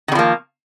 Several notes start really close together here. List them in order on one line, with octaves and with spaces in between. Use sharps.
D#3 D3 F3 A#3